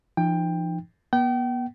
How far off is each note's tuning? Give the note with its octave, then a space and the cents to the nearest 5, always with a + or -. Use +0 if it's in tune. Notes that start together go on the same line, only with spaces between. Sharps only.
F3 -40 D#4 -25 G5 +15
B3 -35 G5 -35